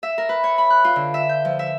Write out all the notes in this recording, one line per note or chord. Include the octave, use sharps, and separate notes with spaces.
E5
A#4
B4
C#5
B5
F#6
F4
D3
E5
G6
F3
E5